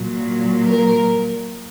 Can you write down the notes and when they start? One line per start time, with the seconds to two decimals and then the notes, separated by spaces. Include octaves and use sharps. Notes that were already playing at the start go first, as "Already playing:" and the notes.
Already playing: A#2 F#3
0.67 A#4